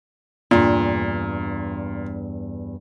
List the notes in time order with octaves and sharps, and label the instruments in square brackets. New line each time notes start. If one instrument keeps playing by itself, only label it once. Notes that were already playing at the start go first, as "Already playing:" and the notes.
[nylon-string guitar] E2 G2 [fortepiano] A#2